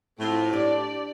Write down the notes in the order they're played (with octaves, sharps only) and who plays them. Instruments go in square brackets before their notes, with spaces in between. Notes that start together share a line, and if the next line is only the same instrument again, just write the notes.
[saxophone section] A2 [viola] C4 F4
[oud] D4 [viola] G4 D5